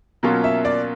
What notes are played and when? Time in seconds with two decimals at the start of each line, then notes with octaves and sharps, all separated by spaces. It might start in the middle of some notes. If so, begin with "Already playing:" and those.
0.23 B2 F#3 A#3 C#4 F4
0.44 E5
0.65 D5